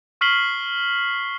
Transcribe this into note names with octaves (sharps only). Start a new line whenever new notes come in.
C#6 F6 B6 C7 F#7 G7